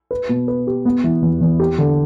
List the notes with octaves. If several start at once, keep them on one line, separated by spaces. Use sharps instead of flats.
B4
B2
B4
G4
B3
E3
E2
E2
G4
D3